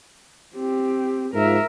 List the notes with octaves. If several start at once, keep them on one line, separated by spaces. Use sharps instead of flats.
C4 G4
G#2 F3 F4 A#4 E5